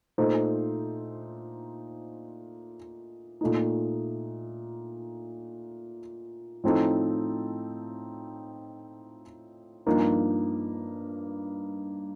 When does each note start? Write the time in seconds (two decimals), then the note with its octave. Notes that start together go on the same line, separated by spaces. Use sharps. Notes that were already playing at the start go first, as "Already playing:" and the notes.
0.18 A#2 A3 D#4 A4 C5
3.41 A#2 A3 D#4
6.64 A2 F3 C4 D#4 A4
9.86 G2 F3 A#3 D#4